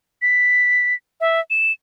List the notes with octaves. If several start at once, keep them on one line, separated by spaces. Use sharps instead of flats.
B6
E5
E7